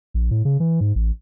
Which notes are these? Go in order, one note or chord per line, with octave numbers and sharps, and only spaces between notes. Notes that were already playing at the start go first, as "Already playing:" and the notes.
A#1
A2
C#3
E3
G#2
A1